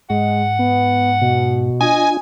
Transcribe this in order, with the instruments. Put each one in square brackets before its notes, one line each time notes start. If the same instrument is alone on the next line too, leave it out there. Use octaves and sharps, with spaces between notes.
[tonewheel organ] G#2 [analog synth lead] G#3 [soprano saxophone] F#5
[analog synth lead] B3
B2
[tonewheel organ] D4 F4 [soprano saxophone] D#5 [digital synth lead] G#5